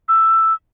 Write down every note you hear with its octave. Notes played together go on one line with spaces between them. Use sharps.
E6